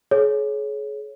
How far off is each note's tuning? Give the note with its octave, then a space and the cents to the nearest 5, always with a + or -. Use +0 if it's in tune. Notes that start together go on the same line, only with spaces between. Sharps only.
G#4 +35 C#5 +0